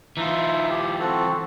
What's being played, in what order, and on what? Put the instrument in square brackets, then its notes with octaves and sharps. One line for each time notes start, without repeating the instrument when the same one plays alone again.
[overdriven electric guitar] E3 F4 [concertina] D#4 E5
[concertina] G4
C4 F#4 A4